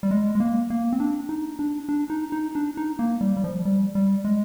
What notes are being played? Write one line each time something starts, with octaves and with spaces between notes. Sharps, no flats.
G3
G#3
G#3
A#3
A#3
C4
D4
D#4
D4
D4
D#4
D#4
D4
D#4
A#3
G3
G3
F3
G3
G3
G#3